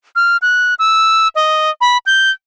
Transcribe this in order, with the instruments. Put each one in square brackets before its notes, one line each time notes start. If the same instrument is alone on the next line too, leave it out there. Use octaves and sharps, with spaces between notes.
[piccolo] F6
F#6
E6
D#5
B5
G6